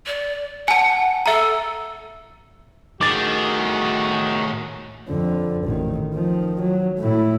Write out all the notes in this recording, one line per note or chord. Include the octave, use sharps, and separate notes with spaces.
D5
F#5 G#5 A5
A4 E5 A#5
A2 D#3 F#4 G#4 D6 A6
F2 D3
A1 D#3
D#3 F3
F#3
A2 E4